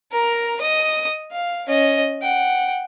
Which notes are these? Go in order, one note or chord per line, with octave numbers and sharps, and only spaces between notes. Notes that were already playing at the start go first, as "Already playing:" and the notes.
A#4 A#5
D#5 D#6
F5
C#4 D#5
F#5 G5